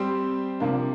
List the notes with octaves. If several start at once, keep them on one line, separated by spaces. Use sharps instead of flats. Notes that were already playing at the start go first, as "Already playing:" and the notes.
Already playing: G3 C4 G4 C5
C3 F3 A#3 D4